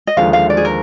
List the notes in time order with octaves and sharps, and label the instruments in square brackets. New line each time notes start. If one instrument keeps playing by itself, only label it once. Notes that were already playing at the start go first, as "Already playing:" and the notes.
[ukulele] D#5
[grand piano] D#2 D3 F3 G#3 [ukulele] F5
[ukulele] F5
D5
G#4
A#4